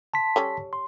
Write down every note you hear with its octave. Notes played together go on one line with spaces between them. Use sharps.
A5 C6 B6
G3 C#4 A4
C6